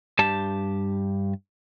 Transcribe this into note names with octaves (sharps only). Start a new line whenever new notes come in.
G2 G4 A5